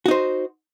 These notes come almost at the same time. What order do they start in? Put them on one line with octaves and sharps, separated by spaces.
F#4 D#4 C5